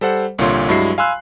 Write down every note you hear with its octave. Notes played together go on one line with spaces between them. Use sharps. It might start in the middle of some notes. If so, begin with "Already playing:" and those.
G3 A4 C5 F#5
C2 A#2 D3 F4 C#5 C6
G2 F#3 G#3 E4 F#4 C7
F5 G#5 B5 C6 E6 F#6